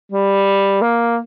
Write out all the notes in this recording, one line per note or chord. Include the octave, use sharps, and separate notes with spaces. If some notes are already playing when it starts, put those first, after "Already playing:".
G3
A#3